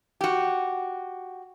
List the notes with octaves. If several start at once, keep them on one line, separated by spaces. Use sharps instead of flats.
F#4 G4